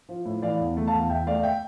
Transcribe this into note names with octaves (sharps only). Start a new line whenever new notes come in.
F3
A2
E3 D5 F5
E2
A3
F5 A5
E2
E2 E5 G5
A3 D5 F5
E5 G5